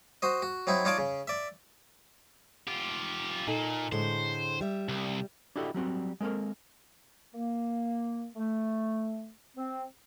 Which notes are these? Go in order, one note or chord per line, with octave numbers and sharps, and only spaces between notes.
F#4 C5 D#5
F#4
F#3 C4 D#4 E4
D#4 F4 C#5 D5 A5 D6
C#3
D5 E5
F4 G4
A#2 D#4 A4
A2 D3 G#3 C5
G3 E5
C2
D4 E4 F#4 G4 A4 D#5
F#3 G3 C4 F#4
G#3 A#3 C4 A4 A#4
A#3
A3
C4